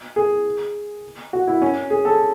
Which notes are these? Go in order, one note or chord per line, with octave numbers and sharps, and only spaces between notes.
G#4
F#4
E4
C#4
G#4
A4